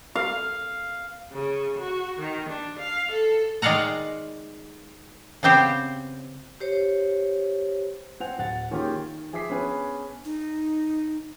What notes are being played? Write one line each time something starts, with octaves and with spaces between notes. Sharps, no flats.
F5
C#3
F#4
D#3
D4
F5
A4
D#3 G#3 D5 F5 F#5 A#5
C#3 B3 C4 G4 C5
G4 C5 C#5
C4 C5 F#5 G#5 F7
D1 F#5 A6
D#3 A#3 C#4 F4 G4 G#4
D#3
F3 G#4 E5 D6 B6 C7
B3 C#4 D4 G#4 B4
D#4